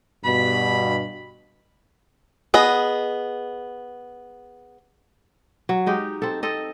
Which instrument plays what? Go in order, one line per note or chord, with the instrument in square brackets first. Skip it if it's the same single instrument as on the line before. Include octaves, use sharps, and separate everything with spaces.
[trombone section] G2 B2 [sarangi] B5
[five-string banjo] B3 G#4 D#5
[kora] F#3
G#3 D#4 G4
C4 A4
C4 A4 D#5